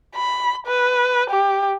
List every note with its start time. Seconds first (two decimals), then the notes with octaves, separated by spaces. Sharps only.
0.15 B5
0.67 B4
1.31 G4